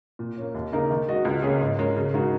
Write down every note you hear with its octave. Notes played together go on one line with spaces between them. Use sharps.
A#2
A#3 C#4
D#2
C#3 A#3 D#4 A#4
D#3
G#3 F#4 D#5
C#2
C#3 A#3 C#4 G#4
G#2
G#3 C#4 A#4
C#3
G#3 D#4 F#4 A#4